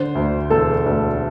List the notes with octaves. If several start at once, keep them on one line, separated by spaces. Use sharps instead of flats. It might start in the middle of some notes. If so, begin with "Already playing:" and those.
Already playing: D3 C5
D2
E1 A4
D2